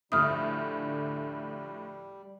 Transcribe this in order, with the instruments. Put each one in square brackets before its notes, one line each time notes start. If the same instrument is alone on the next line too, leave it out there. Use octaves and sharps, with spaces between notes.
[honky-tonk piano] D2 A2 F3 [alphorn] D3 [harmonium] G3 [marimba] D#6 F6